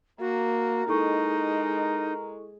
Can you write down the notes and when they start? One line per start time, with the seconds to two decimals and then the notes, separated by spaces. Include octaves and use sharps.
0.20 A#3 F#4 A#4
0.88 G#3 D#4 E4 A4 C#6